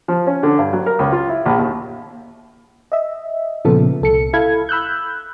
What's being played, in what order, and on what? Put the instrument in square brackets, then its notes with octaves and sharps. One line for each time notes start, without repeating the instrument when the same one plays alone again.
[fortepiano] F3
C#4
D3
G2
F#3
A#4
C#2
F4
E4
A#1
D#2
[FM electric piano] D#5 E5
A#2 C#3 F3 B3 A4
C2 A4 C#7
E4 A4 F5 B5 G#6
B5 E6 F#6 G6